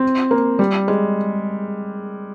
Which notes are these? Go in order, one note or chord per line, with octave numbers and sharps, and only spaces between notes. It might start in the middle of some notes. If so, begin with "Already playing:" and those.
Already playing: C4
A#3
G3
G#3